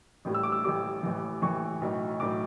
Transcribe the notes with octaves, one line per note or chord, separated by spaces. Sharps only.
A1 A2 G3
E6
D6
E6
A1 A2 G3 D6
A1 A2 E3
A1 A2 E3 C#6
B1 A2 F#3
B1 A2 F#3 D6